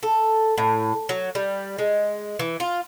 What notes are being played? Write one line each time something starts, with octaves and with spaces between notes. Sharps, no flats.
A4
A2
F#3
G3
G#3
E3
F4